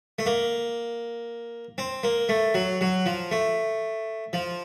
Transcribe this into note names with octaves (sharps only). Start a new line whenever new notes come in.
A3
A#3
C4
A#3
A3
F#3
F#3
F3
A3
F3